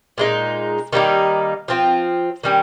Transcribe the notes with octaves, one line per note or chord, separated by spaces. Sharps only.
A#2 G#3 D#4
D#3 G3 A#3 D#4
F3 C4 F4
D#3 G3 C#4